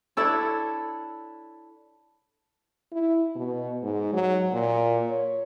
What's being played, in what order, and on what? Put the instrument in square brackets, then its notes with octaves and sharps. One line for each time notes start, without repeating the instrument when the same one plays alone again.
[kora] D4 E4 A4 C#5
[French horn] E4
B2
G#2
F#3
A#2
C#5